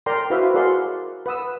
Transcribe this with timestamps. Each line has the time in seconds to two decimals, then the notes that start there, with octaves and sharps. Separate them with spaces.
0.06 A#4 D5 G5 A#5 C6
0.30 E4 F#4 B4 C5 E5 F5
0.54 F#4 G#4 A#4 D5 F#5 C6
1.26 B4 F#5 D#6 E6